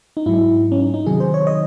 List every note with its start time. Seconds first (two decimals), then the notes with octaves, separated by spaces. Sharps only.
0.17 D#4
0.26 G#2 F#3 E4
0.72 C#4
0.80 D#4
0.94 D#4
1.06 C3 D#3 F#3 G#4
1.20 C5
1.34 C#5
1.47 D#5